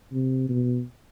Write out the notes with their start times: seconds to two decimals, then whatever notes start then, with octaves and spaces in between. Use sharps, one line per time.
0.13 C3
0.49 B2